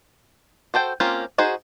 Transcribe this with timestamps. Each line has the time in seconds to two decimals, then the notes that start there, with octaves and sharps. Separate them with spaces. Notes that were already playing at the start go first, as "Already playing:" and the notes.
0.74 F#4 A4 C5 G5
1.00 A#3 C4 C#4 F4 G4
1.38 D#4 F#4 G#4 C5